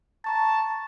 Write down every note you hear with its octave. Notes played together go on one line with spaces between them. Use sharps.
A5 A#5 C#6 A6